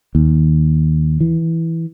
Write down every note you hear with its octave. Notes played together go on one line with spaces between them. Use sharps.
D#2
E3